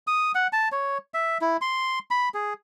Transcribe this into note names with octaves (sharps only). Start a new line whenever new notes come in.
D#6
F#5
A5
C#5
E5
E4
C6
B5
G#4